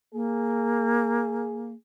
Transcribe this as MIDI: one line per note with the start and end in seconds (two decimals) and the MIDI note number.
0.13 1.73 58
0.13 1.75 68